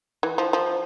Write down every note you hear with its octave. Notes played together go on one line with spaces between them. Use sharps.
E3
F3
F3